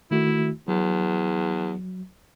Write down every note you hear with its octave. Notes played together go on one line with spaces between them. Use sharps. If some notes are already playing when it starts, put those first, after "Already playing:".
D#3 A3 E4 F#4
E2 F#3